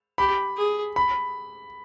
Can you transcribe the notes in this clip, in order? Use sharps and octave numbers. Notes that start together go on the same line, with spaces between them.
G4 B5
G#4
B5